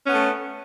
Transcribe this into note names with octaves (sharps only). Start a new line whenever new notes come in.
A3 B3 C#4